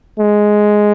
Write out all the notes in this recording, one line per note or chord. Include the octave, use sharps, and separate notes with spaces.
G#3